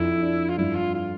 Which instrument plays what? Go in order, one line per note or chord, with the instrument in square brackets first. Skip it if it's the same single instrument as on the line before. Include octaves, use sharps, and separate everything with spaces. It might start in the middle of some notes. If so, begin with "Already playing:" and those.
Already playing: [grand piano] F2 D4 [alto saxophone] E4
[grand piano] D4
[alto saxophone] F4
[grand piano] G2 [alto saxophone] E4
[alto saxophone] F4
F4